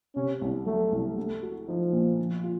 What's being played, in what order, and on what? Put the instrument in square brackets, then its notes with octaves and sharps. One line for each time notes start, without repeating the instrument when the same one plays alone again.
[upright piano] C3 [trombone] C#4
[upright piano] C2
[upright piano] F#3 [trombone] A3
[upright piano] C2
A3
F#4
[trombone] F3 [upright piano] D#4
[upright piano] A#2
F3
F4